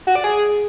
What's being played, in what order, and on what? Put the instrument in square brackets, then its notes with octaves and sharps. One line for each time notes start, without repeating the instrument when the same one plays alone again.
[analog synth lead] F#4
D5
G#4